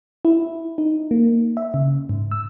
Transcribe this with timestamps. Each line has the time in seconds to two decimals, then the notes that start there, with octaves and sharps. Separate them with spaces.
0.25 E4
0.78 D#4
1.11 A#3
1.57 E5
1.74 C#3
2.09 G#2
2.31 E6